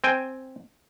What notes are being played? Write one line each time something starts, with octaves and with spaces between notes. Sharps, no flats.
C4 G5 G#5